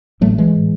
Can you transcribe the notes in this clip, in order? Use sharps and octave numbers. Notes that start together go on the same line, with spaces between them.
A1 A2 F#3 A3
E3 G#3
A2